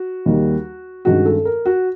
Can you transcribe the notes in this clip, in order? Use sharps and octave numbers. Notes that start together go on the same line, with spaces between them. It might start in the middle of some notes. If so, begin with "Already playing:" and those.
Already playing: F#4
D#2 D#3 G3 A#3
G2 D#3 G#3 C#4 F#4
A4
A#4
F#4